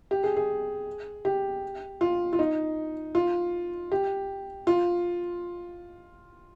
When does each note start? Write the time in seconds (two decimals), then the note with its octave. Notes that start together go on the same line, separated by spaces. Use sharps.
0.11 G4
0.24 G#4
0.37 G#4
1.25 G4
2.01 F4
2.33 F4
2.39 D#4
3.15 F4
3.92 G4
4.67 F4